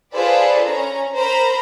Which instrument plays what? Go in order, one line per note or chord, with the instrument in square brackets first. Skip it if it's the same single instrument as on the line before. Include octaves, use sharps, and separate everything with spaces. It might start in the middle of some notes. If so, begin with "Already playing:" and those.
[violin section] F4 G#4 A4 B4 C5 D5
C#4 A#5
A#4 C5 A#5 B5